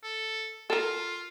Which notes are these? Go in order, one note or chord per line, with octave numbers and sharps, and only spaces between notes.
A4
F4 A4 A#4